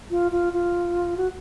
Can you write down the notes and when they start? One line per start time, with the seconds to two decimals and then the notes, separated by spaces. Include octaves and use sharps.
0.11 F4
0.32 F4
0.53 F4
1.17 F#4